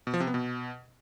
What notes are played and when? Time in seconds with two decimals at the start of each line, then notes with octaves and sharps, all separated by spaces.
0.07 B2
0.14 F3
0.20 C3
0.27 B3
0.34 B2